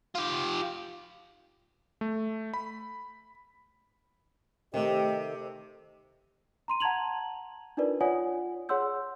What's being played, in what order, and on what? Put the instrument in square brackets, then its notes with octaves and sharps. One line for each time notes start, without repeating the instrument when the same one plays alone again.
[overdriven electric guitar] F4 G4
[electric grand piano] A3
B5
[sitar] C3 [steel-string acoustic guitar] D#3 A3 [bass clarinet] G4 [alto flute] D#5
[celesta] A#5 C6 D#7
F#5 A5 A#5 G#6 F7 F#7
D4 D#4 F4 A#4 B4 D5
F4 C#5 D5 F#5 G#5 D#6
G#4 C#5 F#5 C6 E6 G6